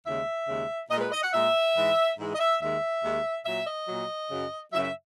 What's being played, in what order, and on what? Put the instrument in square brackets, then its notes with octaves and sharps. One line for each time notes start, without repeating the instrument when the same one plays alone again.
[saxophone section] D#2 C#3 G#3 E5
D#2 C#3 G#3
A#2 D#5
G#3
B4
D#5
F#5
A#2 G#3 E5
G#2 E3 G#3
G#2 E3 G#3
D#5
E5
D#2 D#3 G#3 E5
D#2 D#3 G#3
A#2 F#3 E5
D#5
A#2 F#3
F#2 C#3 F#3
F#2 C#3 F#3 E5
E5